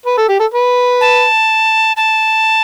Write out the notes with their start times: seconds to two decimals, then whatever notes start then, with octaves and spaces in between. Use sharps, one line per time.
0.06 B4
0.18 A4
0.29 G4
0.40 A4
0.54 B4
1.01 A5
1.97 A5